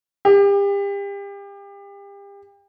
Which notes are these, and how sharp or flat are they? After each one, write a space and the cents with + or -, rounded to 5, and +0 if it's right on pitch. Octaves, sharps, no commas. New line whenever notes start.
G4 +35